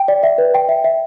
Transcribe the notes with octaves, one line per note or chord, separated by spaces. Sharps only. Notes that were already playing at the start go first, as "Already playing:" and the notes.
Already playing: G5
D5
E5
B4
G5
E5
E5